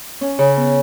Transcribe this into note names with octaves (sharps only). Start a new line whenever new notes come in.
C#4
C#3
B3